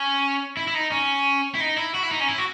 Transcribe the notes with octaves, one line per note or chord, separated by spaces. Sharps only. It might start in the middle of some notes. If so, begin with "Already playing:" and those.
Already playing: C#4
E4
E4
D#4
C#4
E4
D#4
E4
F#4
E4
D#4
C#4
E4
F#4